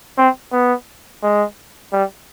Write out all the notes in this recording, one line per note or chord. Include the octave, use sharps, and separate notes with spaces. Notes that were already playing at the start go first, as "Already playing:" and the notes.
C4
B3
G#3
G3